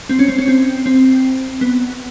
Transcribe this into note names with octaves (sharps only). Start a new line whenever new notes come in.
C4
C#4
C4
C#4
C4
C4
B3